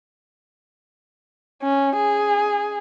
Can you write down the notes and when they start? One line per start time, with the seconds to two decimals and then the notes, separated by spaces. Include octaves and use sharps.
1.63 C#4
1.97 G#4